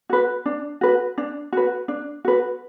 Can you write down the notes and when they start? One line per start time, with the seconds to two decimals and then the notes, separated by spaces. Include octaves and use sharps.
0.10 F#4 B4
0.46 D4
0.81 F#4 B4
1.18 D4
1.53 F#4 B4
1.88 D4
2.25 F#4 B4